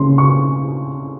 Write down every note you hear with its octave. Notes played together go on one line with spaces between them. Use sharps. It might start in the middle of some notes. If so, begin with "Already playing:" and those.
Already playing: C#3 A#3 C#4 C6
C#6